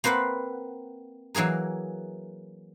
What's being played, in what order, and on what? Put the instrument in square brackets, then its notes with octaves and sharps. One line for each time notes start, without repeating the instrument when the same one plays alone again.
[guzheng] A#3 C4 B4 C5 F#5
E3 F#3 A#3 G#4 A#4